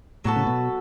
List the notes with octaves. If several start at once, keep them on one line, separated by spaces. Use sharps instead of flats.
A2 F#3 B3 F#4 A4
C#3
B2